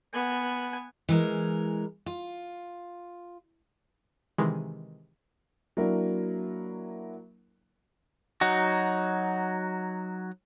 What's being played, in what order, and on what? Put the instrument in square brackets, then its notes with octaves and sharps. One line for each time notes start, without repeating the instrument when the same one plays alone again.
[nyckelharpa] B3 G#5
[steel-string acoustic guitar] E3 G#3 A#4
F4
[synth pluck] C3 D#3 E3 G#3
[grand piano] F#3 A#3 D4 E4 A#4
[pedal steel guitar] F#3 D#4 F#4